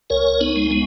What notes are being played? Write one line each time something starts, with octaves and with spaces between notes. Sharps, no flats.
C#2 A#4 C#5
B3 D#4
G#3
G#3 B3